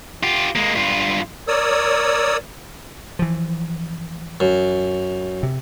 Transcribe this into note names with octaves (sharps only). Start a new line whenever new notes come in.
F4 G4
G#3 A#3
G2 F4
A#4 C#5 D5 D#6 E6
E3 F3
F#2
C3